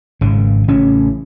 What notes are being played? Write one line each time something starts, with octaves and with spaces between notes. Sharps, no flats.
G#1 C#3
A1 C#3 E3 C#4